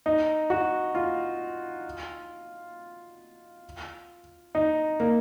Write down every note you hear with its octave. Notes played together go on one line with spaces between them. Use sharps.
D#4
F#4
F4
D#4
A#3